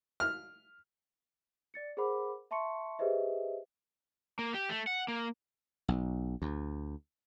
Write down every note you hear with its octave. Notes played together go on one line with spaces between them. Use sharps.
F6
D5 A6 C#7
G#4 A#4 C5 F#5 B5 D6
E5 A5 C6 C#6 C#7
G4 G#4 B4 C5 D#5 E5
A#3
G4
A3
F#5
A#3
B1
D2